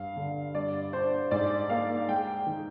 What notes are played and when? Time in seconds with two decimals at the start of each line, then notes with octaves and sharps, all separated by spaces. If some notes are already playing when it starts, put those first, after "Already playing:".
Already playing: G2 F5
0.16 D3
0.55 G2 D5
0.93 D4 C5
1.31 G#2 D5
1.70 A#3 F5
2.08 G#3 G5
2.47 D#3